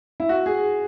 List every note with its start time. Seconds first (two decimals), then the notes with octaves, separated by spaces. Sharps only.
0.20 E4
0.29 F#4
0.46 G#4